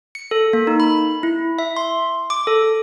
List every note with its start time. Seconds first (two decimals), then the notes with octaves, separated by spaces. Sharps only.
0.15 C#7
0.31 A4
0.53 A#3
0.67 D#4
0.80 B5
1.23 E4
1.59 E5
1.77 C6
2.30 D6
2.47 A4